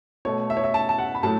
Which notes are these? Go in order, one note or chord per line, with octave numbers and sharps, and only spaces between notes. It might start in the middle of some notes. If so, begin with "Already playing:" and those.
B2 A3 C#5
E5
C#5
E5
A5
A5
F#5
B5
A2 F#3 A3 A5